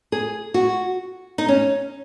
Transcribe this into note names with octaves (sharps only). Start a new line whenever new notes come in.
G#4
F#4
D#4
C#4